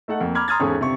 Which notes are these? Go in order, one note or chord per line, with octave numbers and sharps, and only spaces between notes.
A3 D#4 A4 F#5
F2 A#3
A#5 B5 D6 F6 G#6
A#5 C6 D#6 F6 G#6 A6
G#1 E2 C#4 G#4 A4
G1 C3 C#6